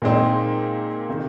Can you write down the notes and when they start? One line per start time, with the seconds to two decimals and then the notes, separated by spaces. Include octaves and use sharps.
0.02 A#2 G#3 C4 D#4
1.09 C3 D#3